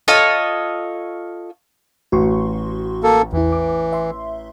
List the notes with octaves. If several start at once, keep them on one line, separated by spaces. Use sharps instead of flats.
F4 A4 C#5 D#5
A1 F#4 C6 C#6
A#3 A4
E2 E3 E4
D6
E5 C6